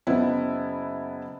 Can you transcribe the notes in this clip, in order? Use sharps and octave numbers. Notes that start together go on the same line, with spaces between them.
F#1 B3 E4